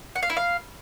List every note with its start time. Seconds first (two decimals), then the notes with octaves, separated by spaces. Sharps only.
0.16 F#5
0.23 F5
0.30 E4
0.37 F5